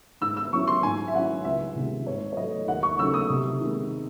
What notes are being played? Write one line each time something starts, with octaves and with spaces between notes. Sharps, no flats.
G#2 E6
E6
F#3 C#4 E4 C#6
C6
G#2 G#5
E5
F#3 C#4 E4 F#5
C#2 E5
C3 D#3 G#3
G#2 C#5
C#5
F#3 A3 D#5
D#2 F#5
C#6
C#3 F#3 A3 D#4 E6
D#6
C3
D#3 G#3